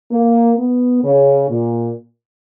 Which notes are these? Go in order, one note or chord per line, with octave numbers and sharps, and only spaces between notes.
A#3
B3
C#3
A#2